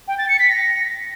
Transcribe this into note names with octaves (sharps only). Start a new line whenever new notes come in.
G5
A6
C#7
B6
A#6